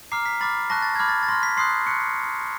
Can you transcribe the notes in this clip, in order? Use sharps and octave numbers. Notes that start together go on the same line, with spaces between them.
A#5 D6 F6 C7
B6
B5 D6 F6 A6
A5 C#6 F#6 A#6
A6
B5 D6 F6 G#6
A6
A6
C6 F6 A#6
B6
C6 D#6 F#6 C7
C#6 F#6 C#7